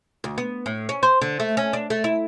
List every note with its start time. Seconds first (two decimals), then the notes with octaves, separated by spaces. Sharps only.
0.24 D2
0.38 B3
0.66 A2
0.89 C#4
1.03 C5
1.21 D3
1.40 A3
1.57 C#4
1.73 D4
1.90 A3
2.04 E4